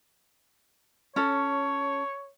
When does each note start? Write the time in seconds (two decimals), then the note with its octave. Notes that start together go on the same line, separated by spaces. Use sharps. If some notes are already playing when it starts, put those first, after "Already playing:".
1.16 C#4 A4 C#5